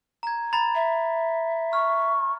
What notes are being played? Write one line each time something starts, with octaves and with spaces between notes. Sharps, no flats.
A#5 G#6
A#5 B5 A6
E5
C#6 F6